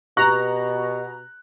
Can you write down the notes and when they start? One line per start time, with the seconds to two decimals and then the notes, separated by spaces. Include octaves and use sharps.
0.17 B2 G4 A#5 C#6 F#6